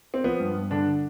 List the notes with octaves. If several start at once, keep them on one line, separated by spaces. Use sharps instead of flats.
C4
F3 B3
G2
G2
D3 D4